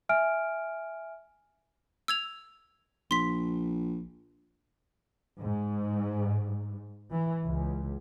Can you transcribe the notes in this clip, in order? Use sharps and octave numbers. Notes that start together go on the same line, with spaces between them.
E5 G#5 F6 D7
E6 G#6 F7
A#1 C6 B6
G#2
E3
C#2